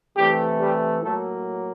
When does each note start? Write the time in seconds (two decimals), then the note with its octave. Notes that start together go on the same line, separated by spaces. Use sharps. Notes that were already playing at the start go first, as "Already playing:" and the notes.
0.16 C3 E3 G3 A3 G4
0.59 G3 G4
1.02 A2 F#3 A3 A#3 A4